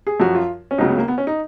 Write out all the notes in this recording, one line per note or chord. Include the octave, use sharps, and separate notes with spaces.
G#4
F#2 F3 F#4
F4
C#4
C#2 C#3 F#3 D#4
B3
A#3
B3
C#4
D#4